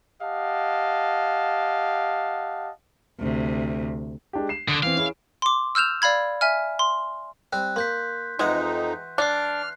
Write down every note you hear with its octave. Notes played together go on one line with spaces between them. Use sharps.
G4 D#5 F5 F#5 A5
D2 C3
G#3 D4 G4
C7 E7
D3 D#6 D7
E3 C4 F5
C#4 E4 G#4
C6 D6
E6 F6 G6 E7 F7
D5 F5 B5 G#6
E5 G#5 F6
C6
G3 C4 F#6
A#3 C6 G6 B6
F2 E3 G#3 D#4 F#4 F#5
D4 F6 F#6 C7